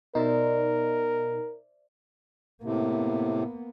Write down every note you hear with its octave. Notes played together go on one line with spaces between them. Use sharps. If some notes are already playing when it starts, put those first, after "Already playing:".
B2 D#4 A#4 C5 D5 E5
A2 C3 A#3 B3